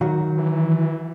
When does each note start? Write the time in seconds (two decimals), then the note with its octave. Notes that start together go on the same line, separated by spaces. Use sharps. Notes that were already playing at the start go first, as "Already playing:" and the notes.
0.01 D#3 F#3 F#4
0.38 E3